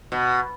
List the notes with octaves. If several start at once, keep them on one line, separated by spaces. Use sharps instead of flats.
B2